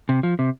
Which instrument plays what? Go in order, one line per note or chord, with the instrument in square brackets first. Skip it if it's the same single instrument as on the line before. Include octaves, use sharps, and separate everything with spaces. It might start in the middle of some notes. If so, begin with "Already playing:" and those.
[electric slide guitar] C3
F3
C3